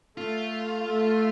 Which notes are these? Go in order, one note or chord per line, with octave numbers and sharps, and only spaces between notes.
A3 F4
A3